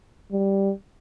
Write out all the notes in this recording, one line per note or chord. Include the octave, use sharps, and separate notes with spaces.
G3